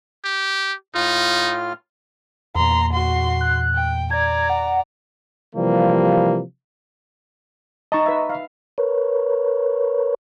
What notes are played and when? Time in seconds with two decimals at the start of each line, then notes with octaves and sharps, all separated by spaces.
0.24 G4
0.95 A2 D#4 F4 F6
2.55 E2 A#2 A#5 C6
2.93 F#4 C6
3.41 F#6
3.75 G5
4.11 D5 A#5 G#6
4.50 F#5
5.54 C3 E3 F3 G3 A#3
7.92 D#4 D#5 A5 A#5 C#6
8.06 B4 E5
8.30 F5
8.78 A#4 B4 C#5